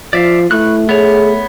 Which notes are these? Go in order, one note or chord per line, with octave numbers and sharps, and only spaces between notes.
F3 D5 E5 F5
A3 E4 B4 C#6 F#6
B3 G#4 C#5